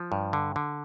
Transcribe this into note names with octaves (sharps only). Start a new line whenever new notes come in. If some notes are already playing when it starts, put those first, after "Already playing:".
Already playing: F3
G2
D3
D3